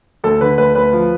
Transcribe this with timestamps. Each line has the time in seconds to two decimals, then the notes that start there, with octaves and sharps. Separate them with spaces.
0.24 D2 A4
0.41 D3 B4
0.58 D2 B4
0.75 D2 B4
0.93 F3